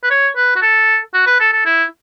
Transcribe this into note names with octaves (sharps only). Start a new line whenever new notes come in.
B4
C#5
B4
F#4
A4
F#4
B4
A4
A4
E4